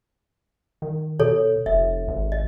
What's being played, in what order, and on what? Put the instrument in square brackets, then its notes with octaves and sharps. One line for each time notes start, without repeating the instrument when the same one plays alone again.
[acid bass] D#3
[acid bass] B2 [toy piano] A4 C#5
[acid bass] F1 [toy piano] E5
[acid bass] G#1
[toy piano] D#5